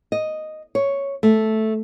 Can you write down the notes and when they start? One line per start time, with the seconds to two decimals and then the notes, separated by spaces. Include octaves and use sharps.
0.12 D#5
0.75 C#5
1.23 A3